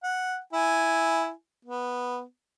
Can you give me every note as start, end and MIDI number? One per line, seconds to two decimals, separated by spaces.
0.03 0.38 78
0.53 1.30 64
0.53 1.30 80
1.65 2.22 59